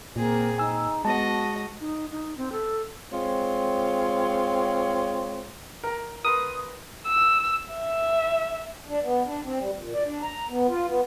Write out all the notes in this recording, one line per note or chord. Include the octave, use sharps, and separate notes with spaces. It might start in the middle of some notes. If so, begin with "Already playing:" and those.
A#2 A#3 C4 G#4
D#4 G#5 E6
G#3 B3 F#4 D#5 A5
D#4
D#4
C4
A4
G#3 C4 F4 C#5
A#4 A#5
A#4 B4 C6 D#6
E6
E5
D4
B3
D4
C4
G3
A#2
D5
D4
A#5
B3
F4
B3